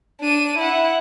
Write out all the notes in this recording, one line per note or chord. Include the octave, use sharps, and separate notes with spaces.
D4 D#7
E4 F#5